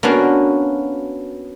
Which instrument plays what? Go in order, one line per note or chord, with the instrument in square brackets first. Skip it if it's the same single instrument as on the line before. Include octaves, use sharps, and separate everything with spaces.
[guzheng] A#3 B3 C#4 D4 F#4 A#4